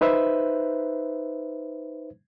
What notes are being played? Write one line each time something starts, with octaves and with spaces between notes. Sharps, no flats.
D#4 B4 C5 E5